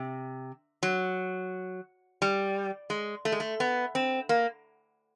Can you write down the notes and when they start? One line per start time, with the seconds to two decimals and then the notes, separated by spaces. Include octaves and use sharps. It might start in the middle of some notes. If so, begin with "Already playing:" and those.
Already playing: C3
0.83 F#3
2.22 G3
2.90 G#3
3.25 A3
3.32 G#3
3.40 A3
3.60 B3
3.95 C4
4.29 A#3